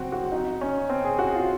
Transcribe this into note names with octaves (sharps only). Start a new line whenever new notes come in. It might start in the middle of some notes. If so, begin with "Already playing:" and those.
Already playing: F#3 C4 F#4
F#4
D#4
C#4
C4
G#4
F#4
F4